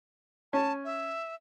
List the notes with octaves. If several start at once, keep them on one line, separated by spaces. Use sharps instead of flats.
C#4 A5
E5